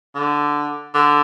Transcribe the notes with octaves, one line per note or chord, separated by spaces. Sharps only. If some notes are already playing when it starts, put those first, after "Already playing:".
D3
D3